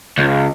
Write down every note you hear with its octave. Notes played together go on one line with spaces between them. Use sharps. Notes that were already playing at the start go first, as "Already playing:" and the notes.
C#2